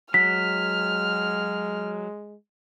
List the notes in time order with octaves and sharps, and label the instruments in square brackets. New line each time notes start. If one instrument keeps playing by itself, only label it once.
[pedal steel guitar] F#3 [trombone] G#3 [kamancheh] F6 [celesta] B6